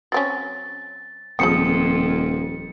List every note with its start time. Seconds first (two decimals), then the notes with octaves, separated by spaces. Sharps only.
0.12 F#3 C4 C#4 A6
1.39 D#1 F2 G#4 C5 G5 D#6 C#7